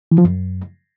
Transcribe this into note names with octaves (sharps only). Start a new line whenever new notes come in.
E3
F3
F#2